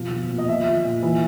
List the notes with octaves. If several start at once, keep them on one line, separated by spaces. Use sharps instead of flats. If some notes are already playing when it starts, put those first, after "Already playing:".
Already playing: B2 F3 F5
F3
A#2
D#5
F3 E5
F3
A#2
E3